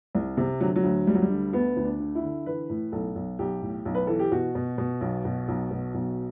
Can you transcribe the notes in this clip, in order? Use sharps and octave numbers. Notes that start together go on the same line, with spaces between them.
C2
C3
D3 F#3
F#3
D2
D2 G3
F#3
G3
D3
D2 B3
D2
D4
D3
E4
D3
E3 B4
A2
B1 A4
B1
B1 G4
A2
B1
B4
E3 A4
G4
B2 F#4
B2
B2
B1
B2
B1
B2
B1